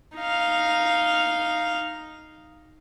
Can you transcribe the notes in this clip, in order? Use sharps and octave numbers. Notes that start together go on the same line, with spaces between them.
D#4 F5